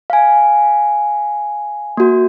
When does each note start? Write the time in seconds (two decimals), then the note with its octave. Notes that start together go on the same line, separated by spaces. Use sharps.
0.10 F5 G#5
1.97 A#3 F#4